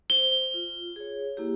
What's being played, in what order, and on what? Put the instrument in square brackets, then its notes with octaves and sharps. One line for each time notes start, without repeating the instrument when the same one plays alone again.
[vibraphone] C5 [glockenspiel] G7
[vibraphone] F4
G#4 C#5
A#3 E4 G4